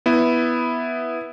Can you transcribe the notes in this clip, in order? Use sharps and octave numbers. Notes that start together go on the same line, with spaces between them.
B3 E4